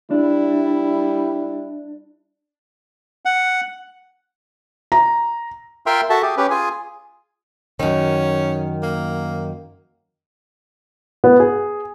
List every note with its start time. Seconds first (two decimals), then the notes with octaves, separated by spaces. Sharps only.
0.11 G3 D4 E4
3.25 F#5
4.92 A#5
5.86 F4 A#4 E5 G5 C6 F6
6.10 F#4 A4 E5 A5
6.22 G4 G#4
6.37 C#4 G4 B4
6.51 F4 G#4 G#5
7.80 F#2 D#3 C#4
8.83 A#3
11.24 B3
11.40 G#4